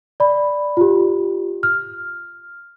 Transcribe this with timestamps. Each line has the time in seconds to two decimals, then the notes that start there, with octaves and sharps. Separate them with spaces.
0.20 D5 B5
0.77 F4 G4
1.63 F6